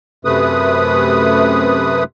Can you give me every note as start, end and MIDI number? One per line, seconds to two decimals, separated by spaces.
0.25 2.04 42
0.25 2.04 48
0.25 2.04 57
0.25 2.04 71
0.25 2.04 87